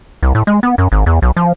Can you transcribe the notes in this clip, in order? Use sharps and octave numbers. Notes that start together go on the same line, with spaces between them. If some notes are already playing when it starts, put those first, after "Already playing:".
C2
A2
G#3
B3
F#2
G#1
E2
B1
F3